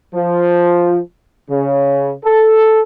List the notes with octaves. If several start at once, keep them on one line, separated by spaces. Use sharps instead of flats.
F3
C#3
A4